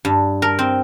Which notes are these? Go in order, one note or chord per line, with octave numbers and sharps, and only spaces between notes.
G2
A#4
C4